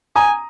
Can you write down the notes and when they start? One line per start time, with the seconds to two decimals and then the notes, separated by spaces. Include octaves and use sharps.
0.16 G#5 A#5 D#6